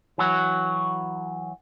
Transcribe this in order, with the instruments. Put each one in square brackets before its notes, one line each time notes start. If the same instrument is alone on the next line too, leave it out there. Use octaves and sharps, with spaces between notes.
[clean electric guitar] E3 F#3 F#4